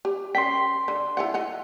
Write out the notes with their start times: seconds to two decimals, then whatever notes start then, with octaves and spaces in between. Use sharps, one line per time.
0.05 G4
0.35 C#4 A#4 G5 C6 B6
0.88 D3
1.17 E4 F4 F#5
1.34 D#5 F#5 A#5